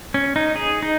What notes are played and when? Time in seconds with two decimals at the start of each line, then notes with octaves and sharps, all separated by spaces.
0.14 C#4
0.36 D#4
0.56 G#4
0.83 D#4